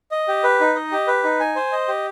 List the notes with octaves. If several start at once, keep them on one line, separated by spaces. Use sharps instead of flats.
D#5
G4
B4
D#4
D#5
G4
B4
D#4
G#5
C5
D#5
G4